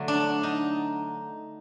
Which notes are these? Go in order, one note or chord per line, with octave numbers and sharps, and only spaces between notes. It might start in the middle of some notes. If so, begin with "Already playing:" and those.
Already playing: D3 F#3 A3
D4
D#4